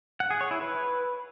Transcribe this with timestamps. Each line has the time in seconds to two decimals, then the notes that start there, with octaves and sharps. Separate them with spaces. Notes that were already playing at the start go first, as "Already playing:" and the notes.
0.20 F#5
0.30 G#4
0.41 C#5
0.51 E4
0.61 B4